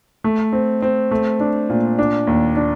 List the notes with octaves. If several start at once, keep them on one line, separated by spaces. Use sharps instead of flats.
A3
C4
C4
A3
D4
A#2
D4
D#2
D4